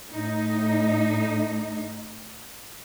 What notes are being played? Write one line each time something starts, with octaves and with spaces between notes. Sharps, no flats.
A2 D#4